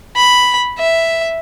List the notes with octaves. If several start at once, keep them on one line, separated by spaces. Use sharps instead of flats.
B5
E5